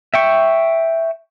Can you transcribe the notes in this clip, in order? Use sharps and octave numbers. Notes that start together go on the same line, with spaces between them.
E5 G5 C#6